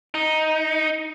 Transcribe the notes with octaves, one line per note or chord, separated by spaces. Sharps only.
D#4